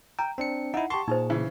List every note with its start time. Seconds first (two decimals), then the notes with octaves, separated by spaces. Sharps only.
0.19 G5 A#5
0.38 C4 D4 C#7
0.74 D#4 E4 F#5
0.90 G4 A5 C6 C#6
1.08 A#2 D#4 G#4 C5
1.30 C#3 E3